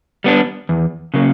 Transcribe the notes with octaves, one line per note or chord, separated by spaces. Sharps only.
G3 B3 D4
E2
C#3 F#3 A#3